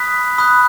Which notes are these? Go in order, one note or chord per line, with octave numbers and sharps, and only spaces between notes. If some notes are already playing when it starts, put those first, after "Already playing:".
Already playing: B5 D#6 F#6 B6
B5 D#6 F#6